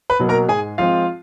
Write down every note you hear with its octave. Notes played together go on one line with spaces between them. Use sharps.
B4 B5
B2 F#3 A#3
A#4 A#5
G#2 G#4 G#5
F3 G#3 C4 F4 F5